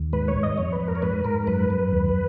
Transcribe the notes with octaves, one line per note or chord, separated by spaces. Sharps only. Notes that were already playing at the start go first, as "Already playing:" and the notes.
Already playing: D#2
G#2 B4
C#5
G#2
D#5
F2 C#5
B4
F2
A#4
C#5
G#2 B4
G#2 A#4
F#2 B4
F#2
D#2